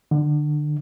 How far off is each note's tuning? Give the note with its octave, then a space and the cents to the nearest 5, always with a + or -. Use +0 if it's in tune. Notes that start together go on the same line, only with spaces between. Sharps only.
D3 +25